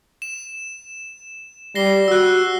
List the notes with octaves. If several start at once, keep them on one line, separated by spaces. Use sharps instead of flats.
E7
G3 A#6 C7 G7
F#4 E6 F#6